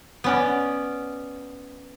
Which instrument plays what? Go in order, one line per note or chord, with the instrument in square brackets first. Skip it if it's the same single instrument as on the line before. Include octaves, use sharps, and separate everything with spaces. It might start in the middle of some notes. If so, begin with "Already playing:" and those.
[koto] B3 C#4 D5